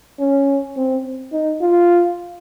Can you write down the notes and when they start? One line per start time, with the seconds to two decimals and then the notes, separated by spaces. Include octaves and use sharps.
0.19 C#4
0.77 C4
1.32 D#4
1.61 F4